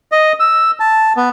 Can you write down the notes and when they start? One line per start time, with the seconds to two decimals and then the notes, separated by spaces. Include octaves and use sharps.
0.12 D#5
0.40 E6
0.80 A5
1.17 B3